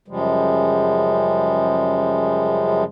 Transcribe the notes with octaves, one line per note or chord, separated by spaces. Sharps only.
F#2 C#3 F3 G3 G#3